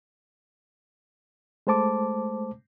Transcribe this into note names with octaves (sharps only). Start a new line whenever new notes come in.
G#3 A3 C5 A5 D6